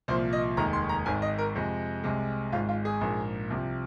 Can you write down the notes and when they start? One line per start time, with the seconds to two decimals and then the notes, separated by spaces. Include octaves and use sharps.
0.08 C2 A#2 F3 C5
0.33 D#5
0.57 F1 D#2 D#3 G#3 A#5
0.73 C6
0.89 A#5
1.06 G#1 G#2 D#3 G#3 G#5
1.22 D#5
1.38 A#4
1.55 F2 C3 G#3
2.04 C2 C3 G#3
2.52 G#1 G#2 G#3 F4
2.69 F4
2.85 G#4
3.01 A#1 G#2 F3 A#3
3.50 C2 C3 F3